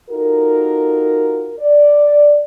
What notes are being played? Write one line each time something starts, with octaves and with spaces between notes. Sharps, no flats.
D#4 F4 F#4 A4 A#4
D5